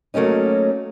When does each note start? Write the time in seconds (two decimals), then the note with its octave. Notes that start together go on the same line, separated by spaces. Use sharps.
0.14 F#3 A3 A#3 C#4 D#4